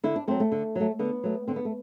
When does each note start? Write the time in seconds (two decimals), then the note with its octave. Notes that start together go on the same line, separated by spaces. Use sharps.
0.04 D3 E4
0.16 D4
0.28 F#3 A3 C4
0.40 A3
0.52 D3
0.76 F#3 A3
0.99 D3 B3
1.24 F#3 A3
1.48 D3 C4
1.56 B3
1.65 A3